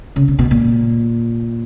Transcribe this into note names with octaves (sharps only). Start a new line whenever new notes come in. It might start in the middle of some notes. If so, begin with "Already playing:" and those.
C#3
C3
B2
A#2